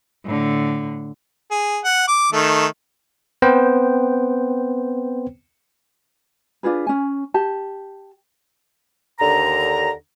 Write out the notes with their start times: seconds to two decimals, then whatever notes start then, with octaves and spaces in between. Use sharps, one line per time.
0.25 A2 D3
1.51 G#4
1.84 F#5
2.08 D6
2.32 D#3 A3
3.42 B3 C4 B4 C5 G5
6.63 D4 F4 G#4 B4
6.87 C#4 G#5
7.34 G4 A5
9.19 D#2 D3 A#5